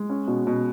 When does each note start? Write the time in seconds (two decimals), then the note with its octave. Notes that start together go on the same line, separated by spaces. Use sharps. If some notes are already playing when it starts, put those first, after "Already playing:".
Already playing: G#3
0.09 C#4
0.27 B2
0.47 B2